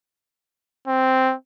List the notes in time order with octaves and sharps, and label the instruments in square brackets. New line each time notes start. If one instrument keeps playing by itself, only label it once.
[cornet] C4